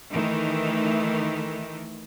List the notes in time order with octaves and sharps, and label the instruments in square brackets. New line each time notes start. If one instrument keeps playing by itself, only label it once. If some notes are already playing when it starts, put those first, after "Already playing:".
[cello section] D#3 E3 A3